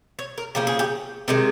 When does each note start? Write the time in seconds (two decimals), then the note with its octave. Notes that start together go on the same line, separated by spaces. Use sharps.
0.19 C#5
0.38 A#4
0.55 C#3 F3 A#3 C#4 G4
0.67 G#4
0.79 G4
1.28 C3 D#3 G#3